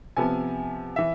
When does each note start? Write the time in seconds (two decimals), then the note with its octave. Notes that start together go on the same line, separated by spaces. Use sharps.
0.17 C3 F3 B3 G#5
0.96 E3 E5